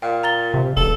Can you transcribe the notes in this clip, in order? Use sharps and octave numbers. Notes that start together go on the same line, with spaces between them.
A#2 F5 G5
A#5 A6 G7
C3
E1 A4